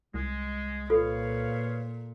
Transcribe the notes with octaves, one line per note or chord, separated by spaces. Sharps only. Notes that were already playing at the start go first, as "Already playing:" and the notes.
C2 G#3
A#2 F4 A4 B4 C#5 F5